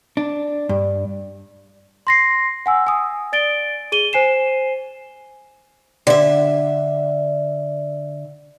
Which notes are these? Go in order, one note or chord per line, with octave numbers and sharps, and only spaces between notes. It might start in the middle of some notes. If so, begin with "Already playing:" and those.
D4
G2
C6 A#6 C7
F#5 G#5 E6
G#5 D#6
D5 A6 D7 G7
G#4 D#7 G7
C5 G#5 C7 E7
D3 E5